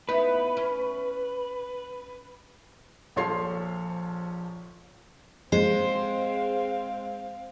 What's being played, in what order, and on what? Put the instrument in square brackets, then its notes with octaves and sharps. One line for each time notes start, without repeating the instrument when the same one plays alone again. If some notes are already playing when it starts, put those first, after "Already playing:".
[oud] B3 D#4 E4 [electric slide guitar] B4
[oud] C#4
[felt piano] A#1 F3 A4 C#5 C6 C7
[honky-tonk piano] G#3 [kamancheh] C4 F5 [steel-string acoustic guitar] C5